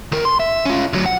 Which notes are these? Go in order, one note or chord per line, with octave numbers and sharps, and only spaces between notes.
D#3 A#4
C6
E5
C#4 F4
D2 F#3
F#5